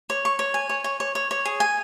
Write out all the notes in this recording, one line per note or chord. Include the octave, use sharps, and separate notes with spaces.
C#5
C#6
C#5
G#5
C#5
C#5
C#5
C#5
C#5
G#4
G#5